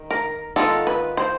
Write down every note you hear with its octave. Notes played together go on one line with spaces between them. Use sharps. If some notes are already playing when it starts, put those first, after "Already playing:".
Already playing: D#3
A#4
D#3 G#3 B3 F4 A4
B4
C5